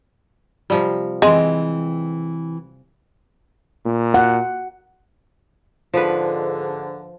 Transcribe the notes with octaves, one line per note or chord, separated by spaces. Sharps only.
C3 F3 G3
E3 G#3 C4 G4
A#2
F#5
G#2 D3 F3 B4